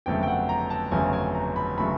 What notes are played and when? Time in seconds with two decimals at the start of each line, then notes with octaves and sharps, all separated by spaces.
0.06 G1 F2 C#3 F#3 A3 G5
0.23 G5
0.27 F#5
0.49 A#5
0.70 A5
0.91 G1 F2 C#3 F#3 A3 G#5
1.13 G#5
1.35 A#5
1.56 B5
1.78 C#3 F#3 A3 B5